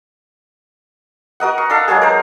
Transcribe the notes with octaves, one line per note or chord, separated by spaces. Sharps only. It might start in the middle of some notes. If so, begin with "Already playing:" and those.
F#4 A#4 D#5 F#5
C#6
D4 A4 F5
F#3 G#3 A#3 G#4
A#4 C5